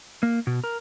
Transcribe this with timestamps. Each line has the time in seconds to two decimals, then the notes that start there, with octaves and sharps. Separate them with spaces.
0.23 A#3
0.47 B2
0.64 A#4